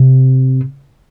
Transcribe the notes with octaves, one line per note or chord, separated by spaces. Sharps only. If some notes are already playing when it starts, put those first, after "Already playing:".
Already playing: C3